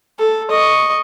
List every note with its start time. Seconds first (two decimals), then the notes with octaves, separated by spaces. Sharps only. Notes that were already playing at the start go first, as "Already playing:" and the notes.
0.19 A4
0.51 D#5 C#6